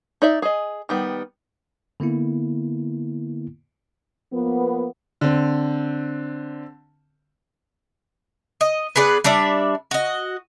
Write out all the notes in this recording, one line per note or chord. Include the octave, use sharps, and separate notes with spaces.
D#4 D5 E5
G#4 D#5
D#3 G3 B3
D3 A#3 B3 E4
F3 A#3 B3
D3 C4
D#5
B3 G#4 B4 D5
G3 D4 D5 E5
F#4 D#5